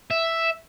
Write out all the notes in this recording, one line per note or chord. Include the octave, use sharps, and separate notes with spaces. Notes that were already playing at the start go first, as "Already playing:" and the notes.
E5